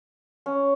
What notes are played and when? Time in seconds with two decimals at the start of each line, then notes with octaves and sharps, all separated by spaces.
0.46 C#4